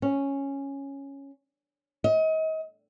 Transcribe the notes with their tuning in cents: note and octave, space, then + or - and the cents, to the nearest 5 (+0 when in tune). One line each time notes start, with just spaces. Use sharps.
C#4 -5
D#5 +35